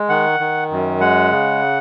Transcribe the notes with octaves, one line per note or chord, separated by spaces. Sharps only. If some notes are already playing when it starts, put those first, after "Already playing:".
Already playing: G#3
D#3 F#5
D#3
F#2
G#3 F#5
C#3